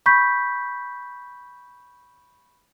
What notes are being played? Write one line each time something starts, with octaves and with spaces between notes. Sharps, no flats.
B5 C#6 G6 B6